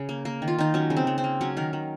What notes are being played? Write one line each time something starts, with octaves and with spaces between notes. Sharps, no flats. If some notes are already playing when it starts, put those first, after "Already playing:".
Already playing: C#3
A#3
A#3
D#3
F4
D#3 D#4
F#3 C#4
C#3
C4
C#3
C4
A#3
F#3 C#4
D#3 A#4
D#3